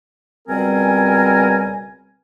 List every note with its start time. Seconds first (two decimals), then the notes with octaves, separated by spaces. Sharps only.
0.48 C#2 B2 G3 C4 A#4 G#5